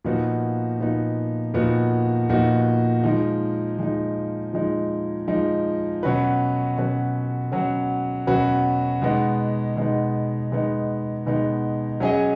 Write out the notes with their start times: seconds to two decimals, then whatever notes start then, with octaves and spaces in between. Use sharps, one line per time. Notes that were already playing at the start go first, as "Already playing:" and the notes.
0.04 A#2 F3 B3 D#4 F#4
0.79 A#2 F3 B3 D#4 F#4
1.54 A#2 F3 B3 D#4 F#4
2.29 A#2 F3 B3 D#4 F#4
3.04 F3 G#3 D#4
3.79 F3 G#3 D#4
4.53 F3 G#3 D#4
5.28 F3 G#3 D#4
6.03 B2 F#3 C#4 F#4 B4
6.77 B2 F#3 C#4 F#4 B4
7.52 B2 F#3 C#4 F#4 B4
8.27 B2 F#3 C#4 F#4 B4
9.02 B2 G#3 B3 D#4
9.76 B2 G#3 B3 D#4
10.52 B2 G#3 B3 D#4
11.26 B2 G#3 B3 D#4
12.00 F#3 C#4 G#4 D#5